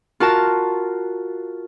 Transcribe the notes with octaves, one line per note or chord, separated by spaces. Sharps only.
F4 F#4 A#4 A5